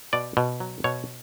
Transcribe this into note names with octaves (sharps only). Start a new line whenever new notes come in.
B2 D5
B2
F#3
B2 C#5